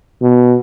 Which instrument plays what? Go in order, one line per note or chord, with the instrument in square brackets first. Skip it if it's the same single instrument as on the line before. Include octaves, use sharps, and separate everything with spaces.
[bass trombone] B2